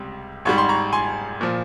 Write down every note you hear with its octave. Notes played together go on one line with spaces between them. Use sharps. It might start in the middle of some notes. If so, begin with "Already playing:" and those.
Already playing: C#2 C3 G3
G#1 G#2 G3 C#6
C6
A#5 C#6
G#5 C6
A#2 F3